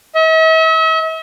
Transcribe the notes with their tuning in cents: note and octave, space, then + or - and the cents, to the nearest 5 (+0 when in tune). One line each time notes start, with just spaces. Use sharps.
E5 -45